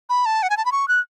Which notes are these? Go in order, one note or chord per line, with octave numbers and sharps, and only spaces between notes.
B5
A5
F#5
G#5
A5
B5
C#6
F#6